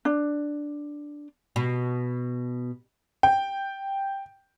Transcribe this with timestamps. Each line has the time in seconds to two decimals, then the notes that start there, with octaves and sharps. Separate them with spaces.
0.05 D4
1.56 B2
3.23 G5